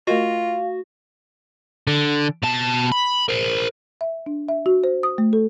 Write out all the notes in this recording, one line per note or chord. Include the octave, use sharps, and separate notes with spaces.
A3 F4 F#4 A#4 D#5 F5
D3
B2 A5
B5
A#4 C5
E5
D4
E5
F#4
C5
D#6
A3
A4